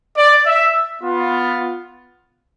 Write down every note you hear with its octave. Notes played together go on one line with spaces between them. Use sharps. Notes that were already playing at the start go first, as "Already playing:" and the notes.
D5
E5
B3 F4